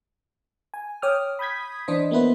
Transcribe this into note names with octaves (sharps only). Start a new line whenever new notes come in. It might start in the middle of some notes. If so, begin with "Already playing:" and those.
G#5
C#5 G5 D6 D#6 F6
B5 D#6 G6 G#6 B6
E3 D4 C5 D#5 B6
A#3 B3 E4 B4 C5